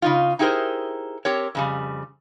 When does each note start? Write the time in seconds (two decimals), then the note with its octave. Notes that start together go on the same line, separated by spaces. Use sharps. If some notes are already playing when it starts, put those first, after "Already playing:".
0.02 C#3 D#4 F4
0.39 D#4 E4 G4 G#4 A#4 C5
1.25 C4 G4 A#4 C#5
1.55 F2 C#3 G3